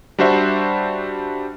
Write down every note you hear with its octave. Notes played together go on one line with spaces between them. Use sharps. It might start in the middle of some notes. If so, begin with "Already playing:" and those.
G3 D4 F#4 C5 E5